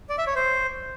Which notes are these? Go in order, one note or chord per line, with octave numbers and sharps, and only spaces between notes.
D5
E5
C#5
C5